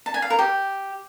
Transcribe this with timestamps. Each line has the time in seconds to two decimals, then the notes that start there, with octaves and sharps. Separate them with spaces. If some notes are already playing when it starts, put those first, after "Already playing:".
0.06 A5
0.14 G#5
0.22 F5
0.30 A#4
0.39 G4